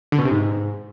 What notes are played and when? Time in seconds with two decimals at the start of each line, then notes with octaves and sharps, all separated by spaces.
0.12 D3
0.19 B2
0.25 C3
0.31 G#2